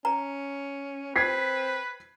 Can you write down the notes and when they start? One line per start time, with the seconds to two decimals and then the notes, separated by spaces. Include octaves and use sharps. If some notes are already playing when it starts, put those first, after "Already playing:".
0.05 C#4 A#5
1.16 C4 B4 G#6 B6 C7